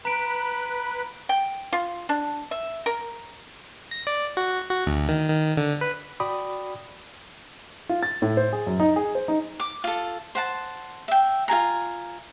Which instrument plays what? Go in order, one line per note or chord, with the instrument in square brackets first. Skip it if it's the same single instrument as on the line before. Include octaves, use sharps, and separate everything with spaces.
[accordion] B4 B5 [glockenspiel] A#5 D7
[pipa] G5
F4
D4
E5
A#4
[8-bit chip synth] A#6
D5
F#4
F#4
D2
D#3
D#3
D3
B4
[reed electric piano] F#4 D5 G5 B5 D#6
[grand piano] F4
A6
A2
C5
G#4
F#2
D#4
G#4
C5
D#4
[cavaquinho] D6
F4 A4
C5 F#5 A5
E5 G5
F4 G#4 G#5 A#5